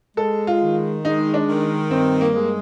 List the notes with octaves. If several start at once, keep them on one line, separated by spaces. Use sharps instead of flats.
G#3 A4
F4
D#3
G#3 D#4
D4
D#3
G2 C4
A#3
G#3